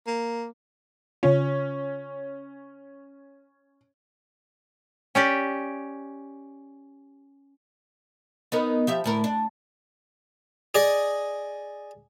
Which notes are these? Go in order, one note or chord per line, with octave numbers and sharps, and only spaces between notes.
A#3
C#3 C#4 F4
C#4 G4 D5
B3 D#4 A#4
F3 G4 E5
D2 A2 A#4
D4
G#4 D5 D#5